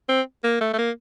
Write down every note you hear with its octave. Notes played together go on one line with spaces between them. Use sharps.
C4
A#3
A3
A3
A#3